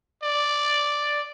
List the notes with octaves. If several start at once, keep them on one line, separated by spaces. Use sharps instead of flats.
D5